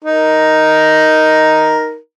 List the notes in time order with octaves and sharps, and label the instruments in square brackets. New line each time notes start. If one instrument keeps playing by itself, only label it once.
[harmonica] D#4 A#4